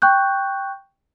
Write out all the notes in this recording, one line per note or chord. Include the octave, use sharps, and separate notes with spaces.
G5 C#6 F#6 G6